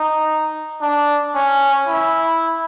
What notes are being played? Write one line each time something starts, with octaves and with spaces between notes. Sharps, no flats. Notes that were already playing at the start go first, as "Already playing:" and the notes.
Already playing: D#4
D4
C#4
E4